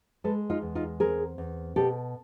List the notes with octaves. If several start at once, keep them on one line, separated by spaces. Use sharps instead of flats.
G#3 A4 B4
D#4 F4
E2
D#4 F4
C4 G#4 A#4
E2
B2 G4 A4